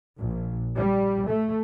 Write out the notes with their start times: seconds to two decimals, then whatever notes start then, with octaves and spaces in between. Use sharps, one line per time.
0.19 A#1
0.77 G3
1.28 A3